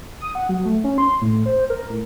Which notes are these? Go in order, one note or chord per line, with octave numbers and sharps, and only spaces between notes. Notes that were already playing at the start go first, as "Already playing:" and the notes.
D#6
F#5
F#3
A3
C#4
C6
A2
C5
A#4
A2